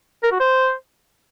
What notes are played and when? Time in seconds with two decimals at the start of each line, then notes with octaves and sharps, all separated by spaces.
0.23 A#4
0.32 F#4
0.40 C5